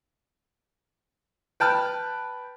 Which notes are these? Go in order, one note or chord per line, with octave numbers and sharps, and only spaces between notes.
B4 G5 A5 F6